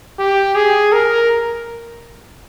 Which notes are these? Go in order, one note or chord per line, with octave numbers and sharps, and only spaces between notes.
G4
G#4
A#4